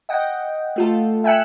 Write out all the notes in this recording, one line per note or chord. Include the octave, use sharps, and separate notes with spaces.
D#5 F#5 G5
A3 F4 A4
E5 G5 G#5 F#6 C#7 E7